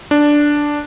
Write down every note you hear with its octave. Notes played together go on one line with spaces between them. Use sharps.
D4